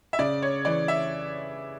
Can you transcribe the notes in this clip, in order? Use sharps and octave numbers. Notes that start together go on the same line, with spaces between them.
E5
C#3 D5
C#5
E3 D5
E5